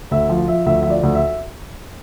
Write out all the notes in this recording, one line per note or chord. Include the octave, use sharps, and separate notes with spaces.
D2 E5
F3
F3 E5
D2 E5
F3 E5
D5
D2
E5